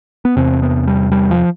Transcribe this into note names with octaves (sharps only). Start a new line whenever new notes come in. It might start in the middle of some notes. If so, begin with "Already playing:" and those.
B3
E2 C3 C4
B3
G3
G3
F3